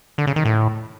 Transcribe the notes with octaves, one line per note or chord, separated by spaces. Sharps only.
D3
C#3
D#3
A2